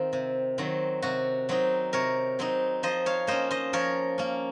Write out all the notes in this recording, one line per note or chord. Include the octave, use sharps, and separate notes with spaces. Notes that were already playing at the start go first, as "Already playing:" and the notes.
Already playing: D#3 C4 F4
C3
D#3 F#3 C4
C3 F#4
F#3 C4 D#4
C3 A#4 C#5
F#3 C4 D#4
F3 C5 D#5
C#5 F5
A#3 C#4 C5 D#5
C5 D#5
F3 A#4 C#5
A#3 C#4